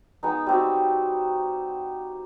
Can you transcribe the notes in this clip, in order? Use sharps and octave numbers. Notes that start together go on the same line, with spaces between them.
G#3 B3 D#4
G3 C4 F#4